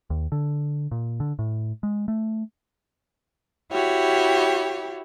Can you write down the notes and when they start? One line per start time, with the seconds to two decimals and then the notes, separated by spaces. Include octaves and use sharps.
0.10 D#2
0.32 D3
0.91 A#2
1.20 D3
1.39 A2
1.83 G#3
2.08 A3
3.71 E4 F#4 G4 C#5